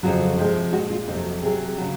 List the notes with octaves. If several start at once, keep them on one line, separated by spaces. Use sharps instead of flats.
F2 C#3 F#3 F4
C3 F3 G#3
A#2 G#3 F#4
F4
F2 C3 F#3 D#4
F#4
C3 D#3 F#3 G#4
C#3 F#3